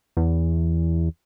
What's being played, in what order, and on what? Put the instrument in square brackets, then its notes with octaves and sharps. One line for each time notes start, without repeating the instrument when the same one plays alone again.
[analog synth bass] E2